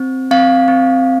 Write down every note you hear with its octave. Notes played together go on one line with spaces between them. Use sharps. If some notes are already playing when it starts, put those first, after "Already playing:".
Already playing: C4
C4 F5
C4